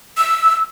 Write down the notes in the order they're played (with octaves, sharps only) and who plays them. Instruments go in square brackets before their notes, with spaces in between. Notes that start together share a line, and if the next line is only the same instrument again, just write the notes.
[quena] E6